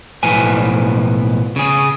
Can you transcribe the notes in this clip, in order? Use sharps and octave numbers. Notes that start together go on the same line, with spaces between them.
B1 A2 F3 B4 G#5
C#3 G#4